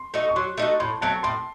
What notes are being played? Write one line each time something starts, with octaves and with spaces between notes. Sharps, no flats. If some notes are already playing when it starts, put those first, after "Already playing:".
Already playing: C6
A3 D#4 F#4
C#6
F#3 C6
A3 D#4 F#4
A2 C6
F#3 A3 C4 A5
A2 C6